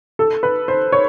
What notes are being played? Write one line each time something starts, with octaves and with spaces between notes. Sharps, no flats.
A4
B4
C5
C#5